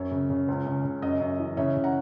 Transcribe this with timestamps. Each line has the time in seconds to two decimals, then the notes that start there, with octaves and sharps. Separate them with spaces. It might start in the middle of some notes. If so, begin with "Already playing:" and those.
Already playing: F#2 C#5
0.11 C#3
0.30 C#3
0.48 C#2
0.66 C#3
0.84 C#3
1.02 F#2 D#5
1.20 F#2
1.40 E3
1.57 C#3 C#5 E5
1.76 C#3
1.84 F#5 A#5